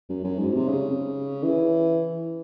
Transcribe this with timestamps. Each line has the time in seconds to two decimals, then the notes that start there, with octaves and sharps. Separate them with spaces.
0.09 F#2
0.24 F#2
0.39 G#2
0.54 C3
0.68 C#3
1.43 E3